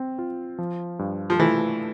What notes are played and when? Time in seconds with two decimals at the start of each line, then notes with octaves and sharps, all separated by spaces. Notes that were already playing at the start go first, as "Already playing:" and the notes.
Already playing: C4
0.19 F4
0.58 F3
0.99 G2
1.30 F3
1.40 E3 A3